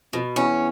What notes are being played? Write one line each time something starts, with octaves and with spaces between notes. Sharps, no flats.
F2 B2
E2 C#4